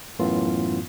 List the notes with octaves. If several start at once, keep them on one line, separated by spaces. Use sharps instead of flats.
F#2 A2 E3 B3 F4